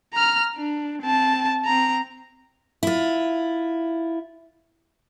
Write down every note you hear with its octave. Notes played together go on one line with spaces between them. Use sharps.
A#5 F6
D4
C4 A5
C4 A#5
E4 F4